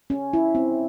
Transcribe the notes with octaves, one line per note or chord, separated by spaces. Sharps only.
C#4
E4
C4